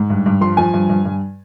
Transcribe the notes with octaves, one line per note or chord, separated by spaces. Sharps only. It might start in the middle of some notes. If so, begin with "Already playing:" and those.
Already playing: G#2
G2
G2
F3 C6
F3 G#5
G2
G2
G2